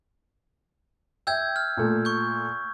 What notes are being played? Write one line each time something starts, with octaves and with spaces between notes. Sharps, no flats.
E5 G5 E6 G6 G#6
F6
A#2 A3
C#6 G6